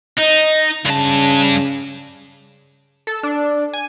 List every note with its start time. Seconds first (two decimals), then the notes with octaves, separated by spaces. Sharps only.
0.19 D#4 D#5
0.86 G2 C#3 A5
3.07 A4
3.23 D4
3.73 G#5